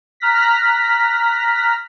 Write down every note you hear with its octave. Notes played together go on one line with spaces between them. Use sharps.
A#5 F6 F#6 A#6 B6